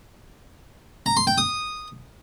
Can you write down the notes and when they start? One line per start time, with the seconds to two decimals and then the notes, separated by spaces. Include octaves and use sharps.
1.06 A#5
1.17 C6
1.27 G5
1.38 D#6